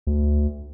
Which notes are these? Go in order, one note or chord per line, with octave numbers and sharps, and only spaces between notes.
D2